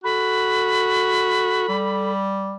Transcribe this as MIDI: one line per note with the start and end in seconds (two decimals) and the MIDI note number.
0.04 1.66 66
0.04 2.12 69
0.04 2.20 83
1.69 2.57 55